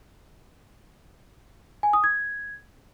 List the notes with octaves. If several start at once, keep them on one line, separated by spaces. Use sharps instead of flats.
G#5
D#6
G#6